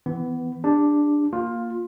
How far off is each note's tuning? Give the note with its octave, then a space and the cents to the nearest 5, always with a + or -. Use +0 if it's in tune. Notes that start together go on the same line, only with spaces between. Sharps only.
E3 -5 B3 +15
D4 +0 G4 +45
A#3 +0 F4 +10